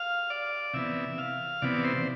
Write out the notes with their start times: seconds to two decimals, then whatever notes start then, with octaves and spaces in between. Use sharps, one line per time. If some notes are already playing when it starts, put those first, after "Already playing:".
Already playing: F5
0.30 D5
0.74 C3 E3 B3 E5
1.18 F5
1.62 C3 E3 B3 D5
1.84 C5